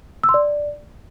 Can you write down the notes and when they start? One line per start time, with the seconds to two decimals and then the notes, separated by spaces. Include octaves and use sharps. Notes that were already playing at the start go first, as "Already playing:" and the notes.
0.24 E6
0.29 C6
0.34 D5